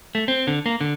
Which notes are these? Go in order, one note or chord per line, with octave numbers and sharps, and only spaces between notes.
A3
C4
D3
A#3
D3